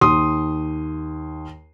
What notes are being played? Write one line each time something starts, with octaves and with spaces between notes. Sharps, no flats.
D#2 C6 D#6